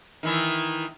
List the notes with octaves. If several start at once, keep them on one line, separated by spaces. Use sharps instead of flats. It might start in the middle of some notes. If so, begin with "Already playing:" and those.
D#3 E3 E4